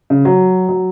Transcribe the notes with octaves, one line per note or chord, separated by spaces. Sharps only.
C#3
F#3
F#3